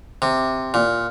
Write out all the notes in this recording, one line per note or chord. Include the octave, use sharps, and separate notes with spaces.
C3
A#2